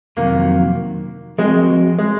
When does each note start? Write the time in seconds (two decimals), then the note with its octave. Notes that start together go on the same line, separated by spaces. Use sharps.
0.17 F2 C3 D#3 F#3 A#3
1.38 F3 G#3 C4 F#4 A#4 D#5
1.98 G#3